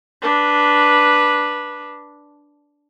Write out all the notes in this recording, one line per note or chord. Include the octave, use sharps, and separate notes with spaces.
D4 B4